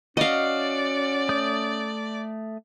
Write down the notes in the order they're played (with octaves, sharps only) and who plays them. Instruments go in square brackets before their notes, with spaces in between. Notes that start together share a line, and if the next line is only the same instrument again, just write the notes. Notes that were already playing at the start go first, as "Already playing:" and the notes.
[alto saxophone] C#4 [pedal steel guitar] F#4 [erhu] D5 [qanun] D#5 F5
[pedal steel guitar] A3 D#6 G6